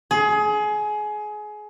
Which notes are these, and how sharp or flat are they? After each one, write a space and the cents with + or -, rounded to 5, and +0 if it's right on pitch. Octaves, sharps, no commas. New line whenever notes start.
G#4 +25